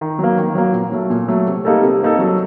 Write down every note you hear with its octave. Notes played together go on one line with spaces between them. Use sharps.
D#3
F#3 A#3
D#3
F#3 A#3
A#2
F#3 A3
A#2
F#3 A3
C3
G3 A#3 D#4 A4
C3
G3 A#3 D#4 A4
F#3